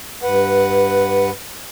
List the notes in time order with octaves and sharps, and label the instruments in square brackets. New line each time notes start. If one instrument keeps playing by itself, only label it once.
[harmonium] G2 B4 F#5